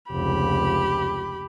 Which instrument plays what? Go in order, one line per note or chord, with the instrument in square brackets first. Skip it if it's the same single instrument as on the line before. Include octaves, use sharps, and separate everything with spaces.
[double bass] F1 C#2 [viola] G4 B5